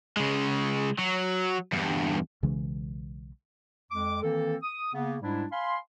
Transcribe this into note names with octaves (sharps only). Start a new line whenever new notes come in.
C#3 G#3
F#3
E2 G2
B1 C#3 E3 G#3
F2 G#3 D6
D#3 E3 A#3 C4 A4
D#6
C#3 A#3 B3
G#2 G3 G#3 D4 E4
F5 G#5 B5 C6